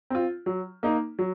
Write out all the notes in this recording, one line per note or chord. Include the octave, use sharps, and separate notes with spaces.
C4 F4
F#3
A#3 D#4
F#3